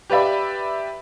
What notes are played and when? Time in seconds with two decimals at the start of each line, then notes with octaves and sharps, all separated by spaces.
0.10 G4 B4 D5 E5 B5